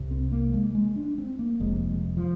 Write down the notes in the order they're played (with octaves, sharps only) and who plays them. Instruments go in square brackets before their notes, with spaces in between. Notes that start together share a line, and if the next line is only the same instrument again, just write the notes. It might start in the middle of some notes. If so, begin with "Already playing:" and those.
Already playing: [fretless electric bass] C2 C3
C4
A#3
G3
G#3
G#3
D4
C4
A#3
F1 F2 C3 G#3
G#3
F3